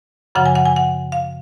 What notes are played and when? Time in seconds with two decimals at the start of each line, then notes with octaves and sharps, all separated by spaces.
0.35 F#2 C#3 F3 F#5
0.46 G#5
0.55 F#5
0.66 G#5
0.76 F#5
1.12 F5